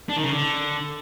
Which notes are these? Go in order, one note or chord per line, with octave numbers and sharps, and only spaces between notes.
D4
D#3
C#3
D3